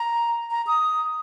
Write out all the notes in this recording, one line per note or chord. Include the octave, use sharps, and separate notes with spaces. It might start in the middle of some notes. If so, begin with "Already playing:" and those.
Already playing: A#5
A#5
D#6